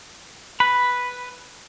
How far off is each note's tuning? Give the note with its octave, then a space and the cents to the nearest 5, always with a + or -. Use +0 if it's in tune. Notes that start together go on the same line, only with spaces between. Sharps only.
B4 +0 B5 +0